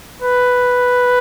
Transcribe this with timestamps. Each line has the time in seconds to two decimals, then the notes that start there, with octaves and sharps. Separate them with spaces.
0.22 B4